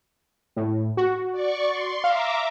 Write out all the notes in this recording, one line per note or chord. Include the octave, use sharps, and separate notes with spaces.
A2
F#4
D5 C#6
C6
E5 F5 A#5 D6